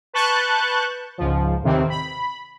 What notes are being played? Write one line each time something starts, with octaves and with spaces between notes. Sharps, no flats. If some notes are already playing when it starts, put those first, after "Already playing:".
B4 A5 C#6 F#6 G6 A6
C#2 G#2 F3
D#2 A2 C3 D#3 E3 C4
B5